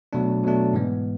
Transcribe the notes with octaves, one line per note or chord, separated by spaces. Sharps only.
B2 F#3 A3 D4
B2 F#3 A3 D4
G#2 E3 G#3 B3